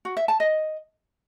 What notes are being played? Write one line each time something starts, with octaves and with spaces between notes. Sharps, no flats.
F#4
E5
A5
D#5